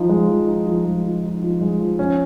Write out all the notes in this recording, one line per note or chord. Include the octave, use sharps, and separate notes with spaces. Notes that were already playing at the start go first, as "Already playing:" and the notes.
Already playing: F3 D#4
G#3
F3
D#4
F3
G#3
F3
D#4
F3
G#3
F3
C#4